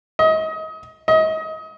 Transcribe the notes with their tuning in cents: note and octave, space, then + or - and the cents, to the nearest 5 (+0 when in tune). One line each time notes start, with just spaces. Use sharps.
D#5 +30
D#5 +30